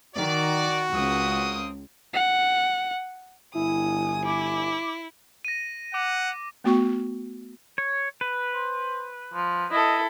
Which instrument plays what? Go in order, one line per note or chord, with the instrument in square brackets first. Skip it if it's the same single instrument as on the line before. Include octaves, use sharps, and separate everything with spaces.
[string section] D#3 [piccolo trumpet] F#4 [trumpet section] D5
[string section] C#2 [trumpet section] A#3 C4 D#6
[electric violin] F#5
[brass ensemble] G1 G#5 [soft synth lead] E4 [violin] D#6
[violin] E4 [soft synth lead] D6
[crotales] A#6 D#7
[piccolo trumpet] F#5 [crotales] D6
[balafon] A3 B3 F#4 G5 C#6
[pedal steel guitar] C#5
B4
[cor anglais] C5
F3
[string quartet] E4 A4 [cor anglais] D#5